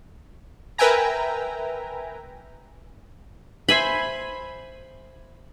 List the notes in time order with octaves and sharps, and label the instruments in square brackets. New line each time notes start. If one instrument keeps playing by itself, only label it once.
[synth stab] A#4 B4 E5 G5 G#5 A#5
[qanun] C5 E5 G#5 B5